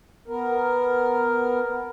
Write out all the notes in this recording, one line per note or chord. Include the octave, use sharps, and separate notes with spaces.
B3 A#4